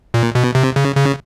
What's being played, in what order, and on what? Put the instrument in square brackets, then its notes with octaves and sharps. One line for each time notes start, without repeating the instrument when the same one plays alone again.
[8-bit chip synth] A#2
B2
C3
C#3
C#3